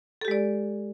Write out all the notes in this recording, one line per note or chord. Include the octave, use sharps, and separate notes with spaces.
G#3 G4 A4 D5